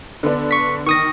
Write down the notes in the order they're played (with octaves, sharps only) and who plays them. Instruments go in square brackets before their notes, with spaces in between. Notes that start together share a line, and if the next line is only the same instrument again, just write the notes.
[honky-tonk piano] D3 B3 D4
[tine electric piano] C#6 B6
[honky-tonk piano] D#3 [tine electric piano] C#6 D#6 A#6